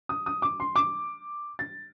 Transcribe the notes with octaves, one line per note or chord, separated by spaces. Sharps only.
D#6
D#6
D6
C6
D6
A6